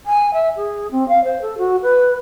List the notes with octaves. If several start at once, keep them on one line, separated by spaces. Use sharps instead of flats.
G#5
E5
G#4
C4
F5
C5
A4
F#4
B4